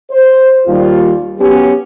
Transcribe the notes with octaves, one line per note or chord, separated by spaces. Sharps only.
C5
D#2 G3 F4
F#3 B3 C#4 G4